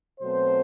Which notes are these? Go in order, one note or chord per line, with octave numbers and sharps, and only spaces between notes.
B2 F#3 A3 C4 C5